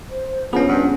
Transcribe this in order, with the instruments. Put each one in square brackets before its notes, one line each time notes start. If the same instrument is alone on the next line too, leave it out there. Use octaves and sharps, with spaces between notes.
[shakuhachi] C5
[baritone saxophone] F3 [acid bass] B3 [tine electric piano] C#4 G#4 [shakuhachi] D4
[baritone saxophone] G2 [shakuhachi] F#5